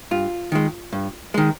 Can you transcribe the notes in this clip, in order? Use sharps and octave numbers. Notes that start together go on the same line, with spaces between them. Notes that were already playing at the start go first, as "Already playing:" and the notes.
G2 F4
D#3 G#3
G2
D#3 G#3